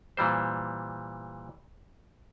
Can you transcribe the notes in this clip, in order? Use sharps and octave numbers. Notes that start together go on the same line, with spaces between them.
A#2 E3 G3 C5